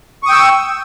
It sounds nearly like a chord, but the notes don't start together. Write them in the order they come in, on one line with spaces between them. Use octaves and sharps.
C#6 D#6 G5 E6